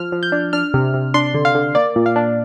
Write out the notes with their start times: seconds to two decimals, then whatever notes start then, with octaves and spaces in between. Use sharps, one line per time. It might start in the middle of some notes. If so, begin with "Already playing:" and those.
Already playing: F3 F6
0.12 F3
0.23 G6
0.32 D4
0.53 D4 F6
0.74 C3
0.94 C3
1.14 D4 C6
1.34 D3
1.45 F5
1.55 D3
1.75 A#3 D5
1.96 A#2
2.06 F5
2.16 D4